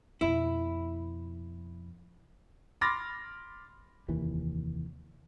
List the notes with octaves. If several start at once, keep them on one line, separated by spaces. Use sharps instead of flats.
F2 B2 E4
B5 C6 D6 F6 A6 A#6
F1 D#2 E3